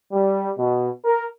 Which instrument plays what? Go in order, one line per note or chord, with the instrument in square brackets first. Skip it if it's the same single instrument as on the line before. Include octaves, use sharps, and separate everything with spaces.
[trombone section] G3
B2
A#4